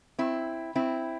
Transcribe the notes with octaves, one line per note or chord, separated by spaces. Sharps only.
C4 E4
C4 E4